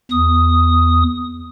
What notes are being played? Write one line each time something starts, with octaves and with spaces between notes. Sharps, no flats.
E2 D#6